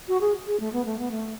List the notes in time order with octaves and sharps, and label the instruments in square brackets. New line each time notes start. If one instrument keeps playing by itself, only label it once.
[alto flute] F#4
G#4
G#4
A3
B3
A3
B3
A3